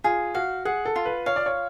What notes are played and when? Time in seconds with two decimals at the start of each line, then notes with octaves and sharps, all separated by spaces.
0.04 F4 G#4
0.35 F#4 F5
0.65 G#4 F#5
0.85 A4
0.96 F4
1.06 B4
1.26 C#5 F5
1.36 D5
1.46 C#5